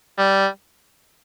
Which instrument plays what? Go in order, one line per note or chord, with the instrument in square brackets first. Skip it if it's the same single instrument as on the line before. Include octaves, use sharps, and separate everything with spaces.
[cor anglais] G3